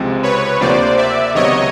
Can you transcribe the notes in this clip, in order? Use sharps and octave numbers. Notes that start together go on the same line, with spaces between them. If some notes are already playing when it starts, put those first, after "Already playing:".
Already playing: C#2 C3 F3 G#3 C4
B4 C#5
D2 C3 F3 A#3 C5 D5
D5 E5
C#2 C3 D#3 F#3 B3 C#5 D#5